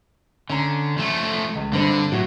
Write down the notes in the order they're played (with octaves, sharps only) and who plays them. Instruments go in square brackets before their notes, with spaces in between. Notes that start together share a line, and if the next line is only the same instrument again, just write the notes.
[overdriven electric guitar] D3 [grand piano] C#4 A#5
[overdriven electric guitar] F3 A3
[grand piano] C#2
[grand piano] G2 C4 D4 [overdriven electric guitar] D3
[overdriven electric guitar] A2 [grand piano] F#3